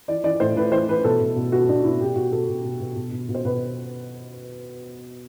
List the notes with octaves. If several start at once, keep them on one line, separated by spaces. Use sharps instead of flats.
E3 D5
E3 D5
A2 C5
A2 B4
E3 C5
E3 B4
B2 A4
B2
B2
B2 F#4
B2 D4
B2 E4
B2 G4
B2 F#4
B2 A4
B2
B2
B2
B2
B2
B2
C5
B2 B4